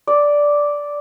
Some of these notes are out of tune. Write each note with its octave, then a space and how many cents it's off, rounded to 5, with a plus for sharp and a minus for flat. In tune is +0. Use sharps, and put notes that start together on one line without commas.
D5 -5